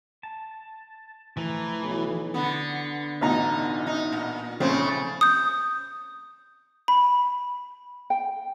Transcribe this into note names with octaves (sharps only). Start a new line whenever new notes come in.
A5
E3 F3 A3 A#5
B1
D3 B3
A1 B2 D3 D#4 A#5
D#4
A#2
A#1 C#3 A3 C4 C5
D#6 G6
B5
G5